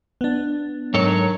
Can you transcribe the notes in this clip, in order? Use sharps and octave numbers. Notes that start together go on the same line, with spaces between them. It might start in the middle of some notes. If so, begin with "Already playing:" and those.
B3 D4
G#2 D#3 F#3 A4 C#5